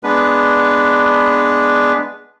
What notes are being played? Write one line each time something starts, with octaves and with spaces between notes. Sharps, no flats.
G#3 B3 D4 B4